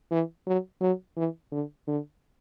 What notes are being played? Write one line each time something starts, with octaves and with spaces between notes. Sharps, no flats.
E3
F#3
F#3
E3
D3
D3